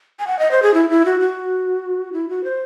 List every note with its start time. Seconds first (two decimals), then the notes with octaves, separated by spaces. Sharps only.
0.19 G#5
0.27 F#5
0.39 D#5
0.51 C5
0.62 G#4
0.74 E4
0.90 E4
1.05 F#4
1.20 F#4
2.13 E4
2.29 F#4
2.44 C5